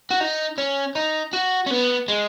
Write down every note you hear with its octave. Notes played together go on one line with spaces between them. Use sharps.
F#4
D#4
C#4
D#4
F#4
C#4
B3
G#3